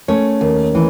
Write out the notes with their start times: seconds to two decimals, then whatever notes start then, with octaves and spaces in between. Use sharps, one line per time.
0.08 A3 C#4 C#5
0.41 D#2
0.75 E3